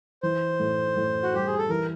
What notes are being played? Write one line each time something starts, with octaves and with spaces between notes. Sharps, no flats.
E3 C5
A2
A2
F#4
G3 G4
G#4
A4
E3 A#4